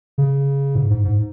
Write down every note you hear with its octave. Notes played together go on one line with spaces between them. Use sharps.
C#3
G#2
G#2
G#2